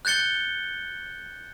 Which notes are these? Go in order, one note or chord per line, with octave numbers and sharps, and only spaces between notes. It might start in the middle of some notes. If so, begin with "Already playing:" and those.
F#6 G6 A6 C#7 G7